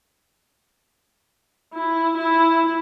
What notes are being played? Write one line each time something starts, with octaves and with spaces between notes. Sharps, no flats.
E4
E4